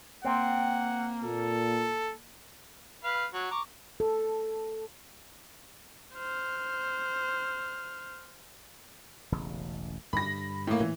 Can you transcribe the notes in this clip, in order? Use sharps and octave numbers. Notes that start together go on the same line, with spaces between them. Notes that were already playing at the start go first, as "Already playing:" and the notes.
A#3 C4 F#5
A#2 A4
B4 F5 F6
F#3 F#4
A#5 C#6 D6
A4
C5 F6
E1 A1 C#3
G2 D3 G3 B5 A#6
A2 A#3
A#2 E3